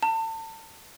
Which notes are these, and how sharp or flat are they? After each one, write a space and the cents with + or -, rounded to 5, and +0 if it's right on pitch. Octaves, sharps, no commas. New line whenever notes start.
A5 +35